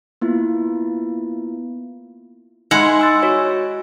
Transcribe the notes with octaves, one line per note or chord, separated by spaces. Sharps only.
A#3 B3 E4 F4
G#3 D#4 E4 F#5 C6
G#5 E6 A6
F#4 C#5